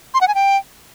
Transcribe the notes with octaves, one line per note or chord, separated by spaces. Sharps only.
C6
F#5
G#5
G5